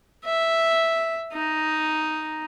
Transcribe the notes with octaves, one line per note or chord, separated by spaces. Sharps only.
E5
D#4